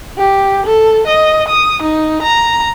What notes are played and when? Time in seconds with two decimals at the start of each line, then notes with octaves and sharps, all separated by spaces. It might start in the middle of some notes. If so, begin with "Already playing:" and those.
0.18 G4
0.66 A4
1.06 D#5
1.48 D#6
1.82 D#4
2.22 A#5